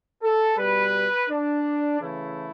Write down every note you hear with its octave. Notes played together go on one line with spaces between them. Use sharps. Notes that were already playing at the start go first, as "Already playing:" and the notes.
A4
B2 G3 B4
D4
C#3 E3 A3 E4